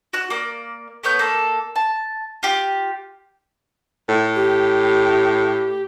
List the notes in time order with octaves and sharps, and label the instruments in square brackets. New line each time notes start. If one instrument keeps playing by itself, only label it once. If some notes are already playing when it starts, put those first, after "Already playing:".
[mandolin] F#4 F#6
A#3 D5
A3 B3 C#5 G6
A#3 A4
A5
F4 G4
[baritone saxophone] A2
[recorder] G4